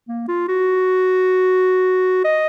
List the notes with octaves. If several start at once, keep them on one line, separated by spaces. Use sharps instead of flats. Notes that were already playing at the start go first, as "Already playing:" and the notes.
A#3
F4
F#4
D#5